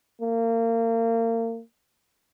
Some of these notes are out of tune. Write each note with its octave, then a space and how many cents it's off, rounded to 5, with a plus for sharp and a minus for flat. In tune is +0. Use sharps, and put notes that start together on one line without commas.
A#3 -30